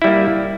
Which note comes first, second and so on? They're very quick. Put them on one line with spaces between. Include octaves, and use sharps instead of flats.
E4 G3 A#3